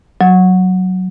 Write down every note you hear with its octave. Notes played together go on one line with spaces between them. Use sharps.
F#3